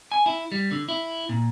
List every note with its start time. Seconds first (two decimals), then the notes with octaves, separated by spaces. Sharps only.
0.12 G#5
0.26 E4
0.52 G3
0.71 D3
0.89 E4
1.29 A#2